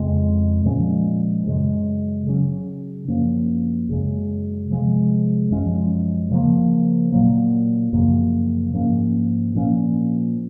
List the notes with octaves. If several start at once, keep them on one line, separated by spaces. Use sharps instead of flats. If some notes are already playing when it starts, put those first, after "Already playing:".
Already playing: F2 C#3 G#3 C4
A#2 F3 G#3 C#4
F#2 C#3 G#3
C#3 F#3 C#4
F#2 F3 A#3 C#4
F#2 C#3 G#3
C3 F3 G#3
F#2 F3 G#3 C#4
C#3 F3 A#3
A#2 F#3 A#3
F#2 C#3 F3 A#3
G#2 F3 A#3 C#4
A#2 F3 A#3 C#4